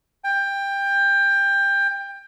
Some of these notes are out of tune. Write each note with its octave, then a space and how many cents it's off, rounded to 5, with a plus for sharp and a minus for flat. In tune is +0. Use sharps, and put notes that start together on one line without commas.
G5 +20